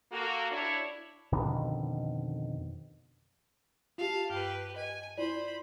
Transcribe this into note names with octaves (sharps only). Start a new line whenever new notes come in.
A#3 F#4 A4
D4 E4 C#5
F2 B2 D3 D#3
F4 G4 F5 A5
G2 G4 B4 F6
D#5 G#5
E4 F4 C5 D5 B5